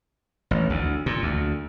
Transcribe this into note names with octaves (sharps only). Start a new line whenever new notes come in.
A1
D2
A#2
D2